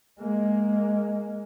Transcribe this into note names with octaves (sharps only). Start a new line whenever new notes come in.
G#3 A#3